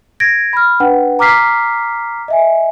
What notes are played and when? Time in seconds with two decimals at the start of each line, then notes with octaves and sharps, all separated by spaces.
0.20 G#6 A#6 D7
0.53 B5 F6
0.80 D4 B4 F#5 G5
1.19 A#5 D6 F6 B6 C7
2.28 D#5 E5 G#5